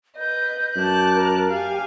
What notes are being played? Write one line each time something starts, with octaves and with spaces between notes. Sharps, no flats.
B4 D#5 G6
F#2 A5 D6 F#6
A#4
G4 F5 G#5